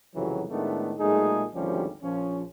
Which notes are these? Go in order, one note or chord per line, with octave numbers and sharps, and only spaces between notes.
C2 F2 C#3 E3 F#3
A2 D#3 G#3 A3 B3 D4
B1 A#2 G#3 A3 D#4 G#4
G#1 D2 F3 G3 C#4 G4
A#1 F3 C#4